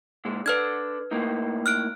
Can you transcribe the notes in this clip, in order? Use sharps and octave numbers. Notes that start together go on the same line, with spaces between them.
A#2 G#3
D4 A4 B4 D5 F6 G#6
A2 A#3 D#4
F6 F#6 D7